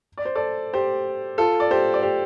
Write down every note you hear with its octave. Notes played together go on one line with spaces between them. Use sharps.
D5
C5
A4 D5
G4 C5
F4 A4
D5
G4 C5
D5
G4 C5